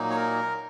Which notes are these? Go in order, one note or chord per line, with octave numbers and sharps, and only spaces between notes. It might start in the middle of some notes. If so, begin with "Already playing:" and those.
Already playing: A#2 F#3 A#3 D#4
C#5
A#4